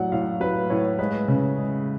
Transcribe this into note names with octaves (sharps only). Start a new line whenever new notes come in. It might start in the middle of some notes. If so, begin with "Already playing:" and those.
Already playing: A2 F#3 D5 F#5
A2 F5
F#3 B4
A2 C#5
G#3 B4
C#3
G#3